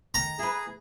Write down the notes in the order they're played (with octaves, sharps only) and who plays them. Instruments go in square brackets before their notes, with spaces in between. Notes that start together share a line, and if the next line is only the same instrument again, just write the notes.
[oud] D#3 [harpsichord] A#5
[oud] E4 B4 [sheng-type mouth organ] G#4